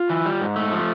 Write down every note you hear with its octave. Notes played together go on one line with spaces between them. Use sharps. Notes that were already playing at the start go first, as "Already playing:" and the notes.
Already playing: F4
E3
G3
G#2
A3
F3